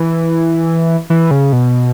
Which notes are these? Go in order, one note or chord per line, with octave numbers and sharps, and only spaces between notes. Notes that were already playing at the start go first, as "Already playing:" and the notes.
Already playing: E3
E3
C#3
B2